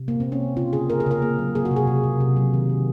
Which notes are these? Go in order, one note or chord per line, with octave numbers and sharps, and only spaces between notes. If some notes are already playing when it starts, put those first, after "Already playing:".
Already playing: C3
A#3
C4
A#3
C#4
C3
C#3 F4
C#3 G#4
A#3 A#4
G#4
C#3 A#4
A#3
F#3
A#3 G#4
F#4
C3
G#4
C3
C3
C3
F#3
D#3
D#3